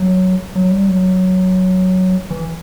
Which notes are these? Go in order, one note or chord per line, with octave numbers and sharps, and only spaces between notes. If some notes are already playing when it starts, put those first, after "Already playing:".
Already playing: F#3
F#3
G3
F#3
E3